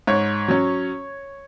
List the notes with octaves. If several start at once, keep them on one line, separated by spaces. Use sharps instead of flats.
G#2 C#5
F#3 C#4